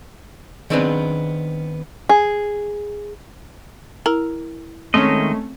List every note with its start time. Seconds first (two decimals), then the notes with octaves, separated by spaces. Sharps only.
0.70 D#3 B3 C4 D4 G#4 B4
2.09 G#4
4.06 E4 A#4
4.94 D#3 G#3 A3 C4 C#4 D#5